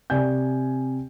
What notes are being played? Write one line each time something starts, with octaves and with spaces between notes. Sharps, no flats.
C3 D5 G#5 G6